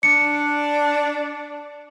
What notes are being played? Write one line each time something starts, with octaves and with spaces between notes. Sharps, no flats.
D4 C#7